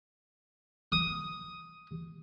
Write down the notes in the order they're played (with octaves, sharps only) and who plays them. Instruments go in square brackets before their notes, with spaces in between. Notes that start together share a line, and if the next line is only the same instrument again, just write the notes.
[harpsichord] D#6